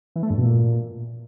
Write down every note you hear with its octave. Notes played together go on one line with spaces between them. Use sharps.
E3
A3
G2
B2
A#2